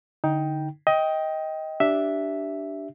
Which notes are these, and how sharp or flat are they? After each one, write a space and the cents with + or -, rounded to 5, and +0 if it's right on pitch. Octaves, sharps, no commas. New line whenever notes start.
D3 +0 D#4 +15 G5 +0
D#5 +20 G5 +0
D4 +0 G4 -15 E5 +0